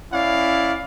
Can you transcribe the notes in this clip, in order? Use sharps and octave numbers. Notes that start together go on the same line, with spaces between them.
C#4 E4 D5 F5